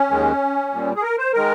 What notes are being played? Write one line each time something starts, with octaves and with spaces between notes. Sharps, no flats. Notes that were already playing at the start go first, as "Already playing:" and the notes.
Already playing: C#4
D#2 D#3 G#3
A#2 G3
G#4
A#4
C5
D#3 G#3 A#4